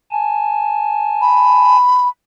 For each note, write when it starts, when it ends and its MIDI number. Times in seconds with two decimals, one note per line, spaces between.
0.11 1.76 80
0.11 1.76 81
1.22 2.08 83